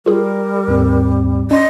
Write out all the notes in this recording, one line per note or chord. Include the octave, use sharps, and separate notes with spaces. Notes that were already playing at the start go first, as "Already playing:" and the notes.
G3 F4 G#4 A#4
D#2 G#2 C4
C#4 D5 D#5 C6